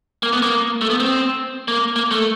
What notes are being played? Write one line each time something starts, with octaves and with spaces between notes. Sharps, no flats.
A#3
B3
A#3
A3
B3
C4
A#3
A#3
A3